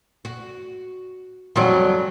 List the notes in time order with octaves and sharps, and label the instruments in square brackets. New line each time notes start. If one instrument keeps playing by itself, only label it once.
[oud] F#4
[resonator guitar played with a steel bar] F2 F#3 [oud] G3 C#4 G4